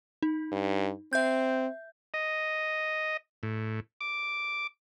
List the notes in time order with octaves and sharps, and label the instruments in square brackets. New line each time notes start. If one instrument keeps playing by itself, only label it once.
[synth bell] D#4
[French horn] G2
[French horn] C4 [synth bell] E5 G6
[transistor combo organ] D#5
A2
D6